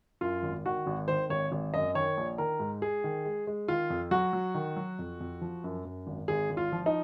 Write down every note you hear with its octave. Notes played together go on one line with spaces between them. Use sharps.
F#2 F4
G#1
D#3 F#4
G#1
D#3 C5
G#1 C#5
G#1
F#2 D#5
D#3 C#5
A#1
D#3 A#4
G#2
G#3 G#4
D#3
G#3
G#3
D#3 F4
F2
F#3 F#4
F#3
D#3
F#3
F2
F2
F3
F#2
F#2
G#1
G#1 G#4
G#1
F4
F3
D#4